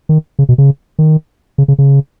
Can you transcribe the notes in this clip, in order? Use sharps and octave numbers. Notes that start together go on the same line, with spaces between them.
D#3
C#3
B2
C#3
D#3
C#3
C#3
C#3